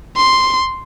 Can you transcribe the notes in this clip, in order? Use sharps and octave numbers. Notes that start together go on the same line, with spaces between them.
C6